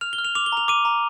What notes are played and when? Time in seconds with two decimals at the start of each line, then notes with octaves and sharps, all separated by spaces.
0.01 F6 F7
0.13 G7
0.18 F6
0.25 F7
0.35 D6 F7
0.46 G7
0.52 A#5 F7
0.68 D6 D#7
0.85 A#5